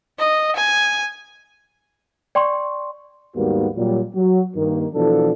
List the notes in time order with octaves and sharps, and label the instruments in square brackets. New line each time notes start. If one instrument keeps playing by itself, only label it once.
[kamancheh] D#5
G#5
[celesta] D5 G5 C6 C#6
[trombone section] D#2 G#2 G3 A#3 B3 F#4
A#2 F#3 G3
F#3 F#4
G2 D#3 A#3
B2 E3 F3 D4 A4